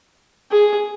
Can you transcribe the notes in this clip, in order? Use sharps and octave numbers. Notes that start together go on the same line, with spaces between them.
G#4